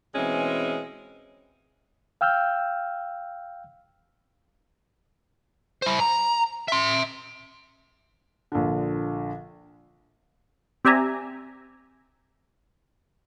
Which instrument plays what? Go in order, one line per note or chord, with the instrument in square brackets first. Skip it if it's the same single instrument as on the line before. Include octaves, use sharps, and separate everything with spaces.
[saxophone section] B2 E3 G#3 C4 C#4
[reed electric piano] F5 G5 E6 F6 G6
[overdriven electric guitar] E4 C5
A#5
E5 C6
[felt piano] A#1 D3
[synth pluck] C4 G4 D5 E5 G#5 A#5